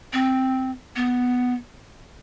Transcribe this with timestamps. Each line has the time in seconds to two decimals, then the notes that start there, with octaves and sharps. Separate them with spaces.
0.13 C4
0.96 B3